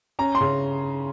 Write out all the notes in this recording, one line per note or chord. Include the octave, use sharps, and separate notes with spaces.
C#4 A#5
C6
C#3